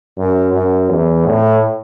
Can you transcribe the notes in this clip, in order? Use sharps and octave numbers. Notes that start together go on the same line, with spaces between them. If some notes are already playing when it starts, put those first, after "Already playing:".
F#2
F#2
E2
A2